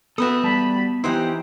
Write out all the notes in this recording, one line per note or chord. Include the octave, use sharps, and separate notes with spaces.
B3 F#4 A4 B4 E5 D#6
G3 A5 B5
E3 D#4 E4 G4 C5 F#5 A#5